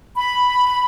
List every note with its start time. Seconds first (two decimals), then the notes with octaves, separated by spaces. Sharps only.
0.17 B5